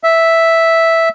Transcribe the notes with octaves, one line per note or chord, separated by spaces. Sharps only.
E5